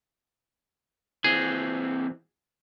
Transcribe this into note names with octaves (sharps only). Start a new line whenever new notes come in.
E3 C4 G#4